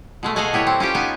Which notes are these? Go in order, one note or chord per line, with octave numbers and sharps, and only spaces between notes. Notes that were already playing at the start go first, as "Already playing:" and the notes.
B2 G#3 A3
G#4 A4 D#5 F5 F#5 G#5
G3 B3 E4 C#5
C4
C#4 F4 G4 G5
B3 D#4 G#5